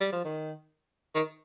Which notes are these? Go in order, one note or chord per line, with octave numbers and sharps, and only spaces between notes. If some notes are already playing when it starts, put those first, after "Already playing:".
G3
F3
D#3
D#3